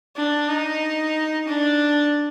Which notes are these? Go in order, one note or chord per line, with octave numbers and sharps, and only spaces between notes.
D4
D#4
D4